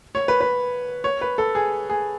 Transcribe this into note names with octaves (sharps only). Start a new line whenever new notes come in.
C#5
B4
B4
C#5
B4
A4
G#4
G#4